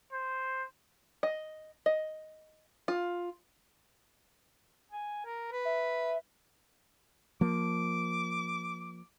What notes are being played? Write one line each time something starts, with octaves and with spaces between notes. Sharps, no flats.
C5
D#5
D#5
F4
G#5
A#4
B4
E5
F3 A#3 D6